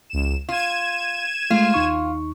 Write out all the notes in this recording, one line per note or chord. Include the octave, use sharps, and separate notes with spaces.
C#2 E7
F4 G#6 D#7 E7
G#3 A3 F4
D#2 D#4 C#6